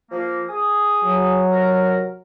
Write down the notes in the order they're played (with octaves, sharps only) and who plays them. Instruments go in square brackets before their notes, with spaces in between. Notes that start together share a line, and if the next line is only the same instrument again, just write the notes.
[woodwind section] F3 A#3
G#4 G#5 D#6
[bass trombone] F#3
[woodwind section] D#2 C3 A#4